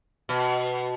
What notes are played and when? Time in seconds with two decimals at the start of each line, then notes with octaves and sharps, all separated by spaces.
0.29 B2